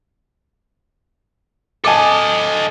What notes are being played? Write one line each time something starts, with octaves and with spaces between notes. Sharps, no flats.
A4 D#5 G#5 A5 D6